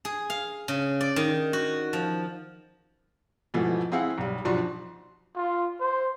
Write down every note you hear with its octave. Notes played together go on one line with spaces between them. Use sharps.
G#4
F5
C#3
D5
D#3
F#4
F3
G#2 B2 E3 F3 A3
C4 E4 G#4 F5 F#5
B1 G3
B1 F3 D4 F#4 C6
F4
C5